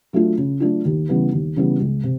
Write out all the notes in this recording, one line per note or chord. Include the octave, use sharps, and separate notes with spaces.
F#3 A3 D4 F4
C#3
F#3 A3 D4 F4
D#2
C#3 E3 G3 B3
D#2
C#3 E3 G3 B3
C#2
C3